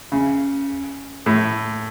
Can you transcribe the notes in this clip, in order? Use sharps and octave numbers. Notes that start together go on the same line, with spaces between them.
C#3
A2